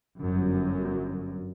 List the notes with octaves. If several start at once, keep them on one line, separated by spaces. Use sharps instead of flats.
G1 F#2